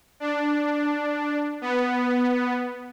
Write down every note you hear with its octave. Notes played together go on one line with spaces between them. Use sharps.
D4
B3